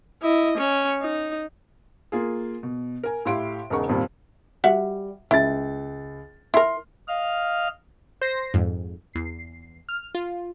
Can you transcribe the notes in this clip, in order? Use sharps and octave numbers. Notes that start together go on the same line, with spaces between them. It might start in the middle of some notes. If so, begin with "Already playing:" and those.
E4 D#5
C#4
D#4
A#3 F4 G#4
B2
A#4 G#5
A2 E4 G4 F5 C6 D7
E1 C#3 D#4 A#4 F#5 C#6
G#1 F2 A#2 G3
G3 F#4 E5 F#5
C#2 E4 A6
E4 A#4 C6 F6
D#5 F5 F6
C5 A#6 C7
F2 G#2
E2 C7
F6
F4